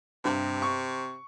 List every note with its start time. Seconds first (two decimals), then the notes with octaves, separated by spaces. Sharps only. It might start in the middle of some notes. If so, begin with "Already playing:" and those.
0.25 G2 C3
0.62 C#6